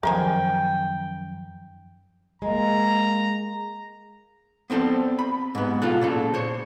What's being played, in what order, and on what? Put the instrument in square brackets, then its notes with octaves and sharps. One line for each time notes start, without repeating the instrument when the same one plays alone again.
[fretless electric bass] F#2 D#3 [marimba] F3 [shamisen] A#4 C5 G#5 [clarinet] G5
[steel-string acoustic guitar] G#3 A#3 [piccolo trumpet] A#5
[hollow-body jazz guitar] B3 C4 A4 C5 D5
B5
G#2 B3
B2 F4 A4 F#5
A#2 C#3 A4
C5 C#5